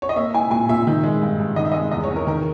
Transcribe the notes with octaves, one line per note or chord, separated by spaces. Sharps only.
C#5
D#5
A#3 E5
E4 G#5
A#2 G#5
A#2 E5
D#3
G#3
G2
G2
D#3 D#5
E5
G#3 D#5
E2 D#5
C#5
E2
A#4
D#3 A#4